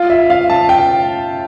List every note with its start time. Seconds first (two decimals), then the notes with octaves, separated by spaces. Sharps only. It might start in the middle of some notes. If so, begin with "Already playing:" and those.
Already playing: F4
0.10 E5
0.30 F5
0.50 A5
0.69 G5